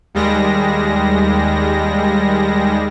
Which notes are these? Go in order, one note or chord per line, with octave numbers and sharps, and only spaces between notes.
D#2 G3 G#3 A#6